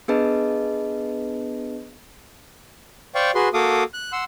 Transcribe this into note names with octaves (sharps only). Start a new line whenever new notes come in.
B3 D4 G#4 B4 D#5 A5
C5 D5 F5 G5 C#6
F#4 G#4 B4 C6
A#3 F#4 A4 F5 D6 D#6
F#6
F#5 C6 E6